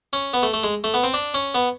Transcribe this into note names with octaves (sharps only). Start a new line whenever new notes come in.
C#4
B3
A3
A3
G#3
A3
B3
C4
D4
C#4
B3